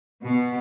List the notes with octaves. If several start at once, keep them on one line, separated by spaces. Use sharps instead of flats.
B2